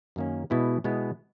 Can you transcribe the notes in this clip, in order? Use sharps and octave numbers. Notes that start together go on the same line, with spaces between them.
F#2 D#3 A#3 C#4
B2 G#3 B3 E4
B2 G#3 B3 E4